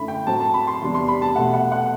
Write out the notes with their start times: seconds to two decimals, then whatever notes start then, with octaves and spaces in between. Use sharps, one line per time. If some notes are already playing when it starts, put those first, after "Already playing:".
Already playing: F#2 D3 A3 E4 B5
0.08 G5
0.27 A2 F#3 C4 A5
0.40 A5
0.54 B5
0.67 C6
0.81 E2 C3 G3 D4
0.95 C6
1.08 B5
1.22 A5
1.35 E2 B2 A3 F#5
1.54 F#5
1.72 F#5